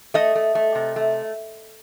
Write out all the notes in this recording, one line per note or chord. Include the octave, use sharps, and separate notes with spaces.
A3 D#5
A3
A3
C3
A3